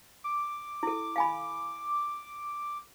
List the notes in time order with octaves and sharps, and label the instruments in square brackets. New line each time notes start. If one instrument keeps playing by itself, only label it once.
[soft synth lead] D6
[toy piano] E4 A4
F5 G#5 B5